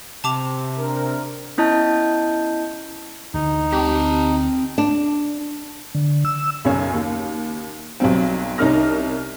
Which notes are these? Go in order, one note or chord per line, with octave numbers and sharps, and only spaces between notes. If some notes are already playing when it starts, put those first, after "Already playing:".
C3 A5 D6 F7
D4 A#4
B3 C#4 E4 D#5 A5 G6
D2 D3 E3 D#4
C4 G4 A5 A#5
D4
D3
E6
B1 F#2 C#3 C#5 G#5
D#2
B1 F#3 G3 C4
C2 C#4 D#4 A#4 F6 A#6